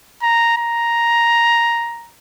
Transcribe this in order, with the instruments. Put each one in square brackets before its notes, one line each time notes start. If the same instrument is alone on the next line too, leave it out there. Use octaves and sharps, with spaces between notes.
[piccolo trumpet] A#5
A#5